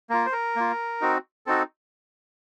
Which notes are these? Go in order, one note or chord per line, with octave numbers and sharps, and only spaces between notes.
A#3 F4 A#4
C5
A#4
A#3 F4
C4 D#4 F#4
C4 D#4 F#4 A4